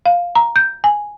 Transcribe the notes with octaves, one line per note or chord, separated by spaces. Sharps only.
F5
A#5
G6
G#5